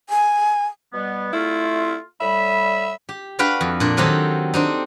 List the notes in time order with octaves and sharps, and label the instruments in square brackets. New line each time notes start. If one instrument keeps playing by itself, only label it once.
[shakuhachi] G#5
[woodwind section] B2 G3 B3
[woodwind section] A3 F4 [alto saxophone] E4
[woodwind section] A2 G3 B5 [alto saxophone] E5
[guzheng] G4
D4 F#4 B4 F5 G5
F2
A#2 D4
D#3 F#3 C4 D#4 G4 A4
C4 D4 D#4